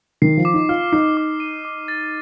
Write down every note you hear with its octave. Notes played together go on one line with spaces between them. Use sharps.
D#3 C7
F3
D6
D#4
F4 F6
D#4 C7
D6
D#7
D6
A6